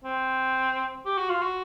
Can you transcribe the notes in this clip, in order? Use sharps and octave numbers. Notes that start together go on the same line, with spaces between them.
C4
G4
F#4
F4
F#4